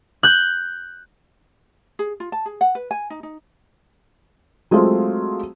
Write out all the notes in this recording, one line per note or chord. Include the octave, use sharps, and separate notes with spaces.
F#6 G6
G#4
F4
A5
G#4
F#5
B4
G#5
D#4
D#4
F#3 G#3 A3 C4 F4